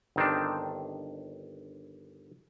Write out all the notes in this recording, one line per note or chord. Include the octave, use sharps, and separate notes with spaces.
G1 D#3 C4 D4